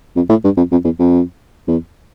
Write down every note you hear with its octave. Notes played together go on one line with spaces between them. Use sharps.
F2
A2
G2
F2
F2
E2
F2
E2